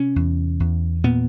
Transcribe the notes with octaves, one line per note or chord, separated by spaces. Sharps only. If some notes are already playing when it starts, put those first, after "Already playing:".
Already playing: C3 C#4
E2
E2
A#2 B3